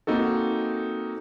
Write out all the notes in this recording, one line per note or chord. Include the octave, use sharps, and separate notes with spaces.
A#3 C4 D#4 F#4 A4